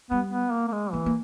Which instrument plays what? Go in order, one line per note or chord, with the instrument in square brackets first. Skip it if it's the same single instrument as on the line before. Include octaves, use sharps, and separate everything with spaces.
[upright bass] G3 [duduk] B3
[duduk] B3
A#3
A#3
G#3
[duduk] E3 [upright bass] A#3
[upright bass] A#3